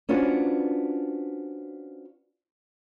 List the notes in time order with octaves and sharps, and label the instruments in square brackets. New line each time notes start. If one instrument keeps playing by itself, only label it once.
[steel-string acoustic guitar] C#4 D4 F4 F#4 B4 C5